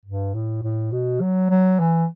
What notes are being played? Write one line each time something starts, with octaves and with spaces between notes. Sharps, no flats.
G2
A2
A2
B2
F#3
F#3
E3